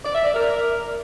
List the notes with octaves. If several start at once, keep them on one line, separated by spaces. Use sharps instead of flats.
D5
E5
D5
A#4